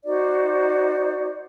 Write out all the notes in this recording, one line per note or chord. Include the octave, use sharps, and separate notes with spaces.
D#4 F#4 C5 D5